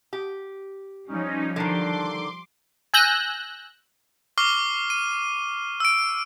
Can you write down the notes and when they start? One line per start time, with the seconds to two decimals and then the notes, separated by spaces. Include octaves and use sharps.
0.13 G4
1.07 F3 G3 C#4 D#4
1.56 D3 D#3 D4 C6 D6
2.94 G#5 E6 F#6 G6 A#6
4.38 C#6 D6 F6 C7 G7
4.90 D#7
5.80 E6 D7